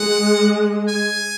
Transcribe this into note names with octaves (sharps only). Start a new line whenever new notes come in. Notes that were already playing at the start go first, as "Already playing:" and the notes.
Already playing: G#3 F#5
G#5